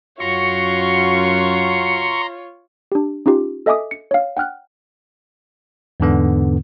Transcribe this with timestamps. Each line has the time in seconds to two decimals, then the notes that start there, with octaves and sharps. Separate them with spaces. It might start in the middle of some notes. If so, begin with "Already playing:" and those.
0.20 F#2 F4 F#4 C#5 A#5 C6 C#6
2.92 D4 G4
3.26 C#4 D#4 F4 G4
3.66 A4 D#5 E5 G#5 D6 D#6
3.91 C#7
4.11 C#5 F5
4.37 F#5 G5 F6 F#6
6.00 E2 G#2 D3 B3